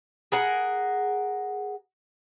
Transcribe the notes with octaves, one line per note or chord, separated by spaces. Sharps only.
G#4 A#4 F#5